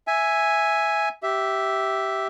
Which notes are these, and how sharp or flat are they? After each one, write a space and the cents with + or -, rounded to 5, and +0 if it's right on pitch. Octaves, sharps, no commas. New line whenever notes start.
E5 +0 G#5 +0
G4 -15 E5 +0